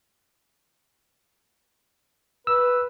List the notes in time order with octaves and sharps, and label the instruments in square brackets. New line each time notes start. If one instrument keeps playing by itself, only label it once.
[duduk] B4 [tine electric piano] E6